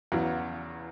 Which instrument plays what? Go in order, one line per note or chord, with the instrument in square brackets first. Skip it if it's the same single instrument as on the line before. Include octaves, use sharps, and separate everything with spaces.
[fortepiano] E2 C#3 F#3 B3